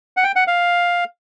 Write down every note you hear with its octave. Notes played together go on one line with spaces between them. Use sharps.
F#5
G5
F#5
F5